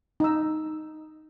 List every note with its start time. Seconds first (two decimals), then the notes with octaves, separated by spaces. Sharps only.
0.20 D#4 E6